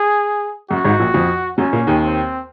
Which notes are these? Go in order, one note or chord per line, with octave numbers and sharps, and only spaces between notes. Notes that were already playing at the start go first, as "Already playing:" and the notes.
Already playing: G#4
F#2 F#4
G#1 G#2
A#1 A#2
F2 F3
F#2 F#3 C#4
A#2 A#3
D#2 D#3
C4